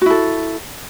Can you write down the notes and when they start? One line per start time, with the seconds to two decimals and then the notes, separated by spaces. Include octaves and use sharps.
0.01 F#4
0.06 E4
0.10 A4